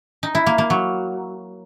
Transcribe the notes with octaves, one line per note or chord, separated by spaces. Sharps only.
D#4
E4
A#3
A#3
F#3